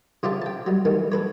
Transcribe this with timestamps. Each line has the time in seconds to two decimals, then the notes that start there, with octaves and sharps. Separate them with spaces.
0.23 C#3 F4 G4 C5 E5 A5
0.42 G5 A5
0.66 F#3 G3
0.85 D#3 E3 G3 A3
1.12 A4 B4 C#5